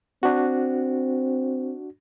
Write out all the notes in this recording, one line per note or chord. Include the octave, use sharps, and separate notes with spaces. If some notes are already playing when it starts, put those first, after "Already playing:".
C4 D4 F#4